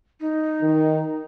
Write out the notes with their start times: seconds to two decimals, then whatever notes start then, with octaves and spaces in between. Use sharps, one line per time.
0.20 D#4
0.61 D#3